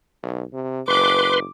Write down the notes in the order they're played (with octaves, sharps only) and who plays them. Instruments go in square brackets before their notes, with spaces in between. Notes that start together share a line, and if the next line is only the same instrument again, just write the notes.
[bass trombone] B1
C3
[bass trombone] F#1 [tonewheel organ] B4 C6 [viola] D6